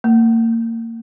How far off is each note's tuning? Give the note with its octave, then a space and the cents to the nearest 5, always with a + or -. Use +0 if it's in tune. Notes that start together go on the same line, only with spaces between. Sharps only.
A#3 -30